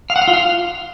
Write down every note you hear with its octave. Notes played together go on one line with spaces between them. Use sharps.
F5
F#5
F5
F4
F5